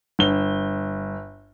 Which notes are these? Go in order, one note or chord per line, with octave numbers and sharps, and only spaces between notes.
G1 G7